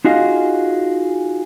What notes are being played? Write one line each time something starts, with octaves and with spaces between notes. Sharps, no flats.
D#4 F4 F#4 G#4 D#5 F5